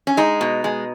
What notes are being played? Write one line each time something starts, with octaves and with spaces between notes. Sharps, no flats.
C#4
G#3 D#4
B2
G#3